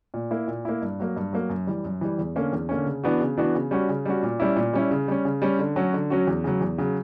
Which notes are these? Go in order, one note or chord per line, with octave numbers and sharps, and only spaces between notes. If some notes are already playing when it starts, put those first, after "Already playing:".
A#2
A#3 E4
A#2
A#3 E4
G2
F#3 A#3
G2
F#3 A#3
F#2
E3 G3
F#2
E3 G3
E2
D3 A#3 C#4
E2
D3 A#3 C#4
C#3
E3 B3 D4 F#4
C#3
E3 B3 D4 F#4
C#3
G3 C#4 F#4
C#3
G3 C#4 F#4
A#2
G3 C#4 E4
A#2
G3 C#4 E4
C#3
G3 C#4
C#3
G3 C#4
D3
F#3 C#4 F#4
D3
F#3 C#4 F#4
E2
C#3 F#3
E2
C#3 F#3